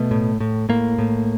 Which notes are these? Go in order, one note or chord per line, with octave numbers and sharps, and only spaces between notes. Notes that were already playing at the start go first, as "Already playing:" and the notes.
Already playing: B2 A3
A2
A2
A2 A#3
A2